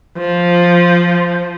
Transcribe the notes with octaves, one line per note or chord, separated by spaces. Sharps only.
F3